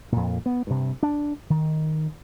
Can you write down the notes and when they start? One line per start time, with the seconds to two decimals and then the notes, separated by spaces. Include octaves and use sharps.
0.12 F2 A#2
0.46 B3
0.67 G2 C3
1.03 D4
1.50 D#3